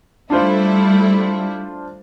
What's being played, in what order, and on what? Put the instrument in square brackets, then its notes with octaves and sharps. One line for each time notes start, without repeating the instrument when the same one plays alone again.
[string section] G3 A3 E4 [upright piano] D4 F4 C5